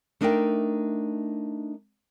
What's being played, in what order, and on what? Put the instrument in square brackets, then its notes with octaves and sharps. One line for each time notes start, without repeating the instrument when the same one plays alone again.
[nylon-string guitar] A3 D4 D#4 A#4 E5 G5